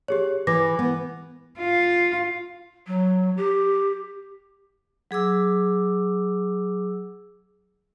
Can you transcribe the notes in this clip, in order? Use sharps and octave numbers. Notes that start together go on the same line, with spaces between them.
G4 G#4 C#5
E3 B4 D6 A#6
B3
F4
F#3
G4
F#3 G#4 D6 E6